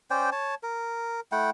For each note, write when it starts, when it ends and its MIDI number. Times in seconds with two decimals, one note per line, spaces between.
0.10 0.30 61
0.10 0.30 72
0.10 0.30 74
0.10 0.30 79
0.32 0.55 73
0.32 0.55 81
0.63 1.20 70
1.32 1.50 57
1.32 1.50 64
1.32 1.50 78
1.32 1.50 79